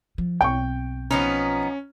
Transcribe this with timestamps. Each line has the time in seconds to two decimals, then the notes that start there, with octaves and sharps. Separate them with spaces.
0.18 F3
0.41 B1 C4 G5 C#6
1.11 F3 B3 C#4 D#4